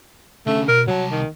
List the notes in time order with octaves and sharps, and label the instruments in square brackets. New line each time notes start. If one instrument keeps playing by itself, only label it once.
[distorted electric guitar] D3 C#4 [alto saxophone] A3
[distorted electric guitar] B2 [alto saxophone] A#4
[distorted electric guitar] C2 A5 [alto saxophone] F#3
[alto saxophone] D#3